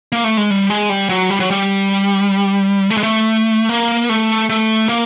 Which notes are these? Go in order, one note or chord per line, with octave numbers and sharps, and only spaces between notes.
A#3
A3
G#3
G3
G#3
G3
F#3
G3
F#3
G3
A3
G#3
A3
A#3
A3
A3
A#3